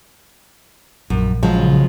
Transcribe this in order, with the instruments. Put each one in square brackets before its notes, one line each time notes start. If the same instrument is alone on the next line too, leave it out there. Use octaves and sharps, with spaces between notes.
[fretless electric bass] A#1 [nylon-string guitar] F#2
[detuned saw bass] C#3 [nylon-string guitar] F3 F#3 G#3